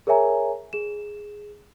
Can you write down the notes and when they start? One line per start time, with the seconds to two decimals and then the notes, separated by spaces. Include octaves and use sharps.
0.07 G#4 A#4 C#5 E5 G#5 A#5
0.73 G#4 E7